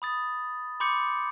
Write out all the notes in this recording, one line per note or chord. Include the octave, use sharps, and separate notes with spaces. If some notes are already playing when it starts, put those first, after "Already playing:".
B5 D#6 A6
B5 C6 D6 G6 C#7